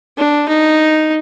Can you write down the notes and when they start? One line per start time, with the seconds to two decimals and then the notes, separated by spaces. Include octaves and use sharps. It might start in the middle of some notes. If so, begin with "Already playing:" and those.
0.17 D4
0.48 D#4